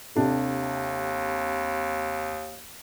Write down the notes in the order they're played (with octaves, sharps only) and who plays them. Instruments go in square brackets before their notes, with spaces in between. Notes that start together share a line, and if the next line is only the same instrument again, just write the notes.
[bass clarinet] D#2 [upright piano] C3 D4 A4